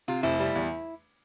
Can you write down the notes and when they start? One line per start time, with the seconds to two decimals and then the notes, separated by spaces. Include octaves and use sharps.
0.08 C3 F4
0.23 F1 E4
0.40 G3
0.55 E2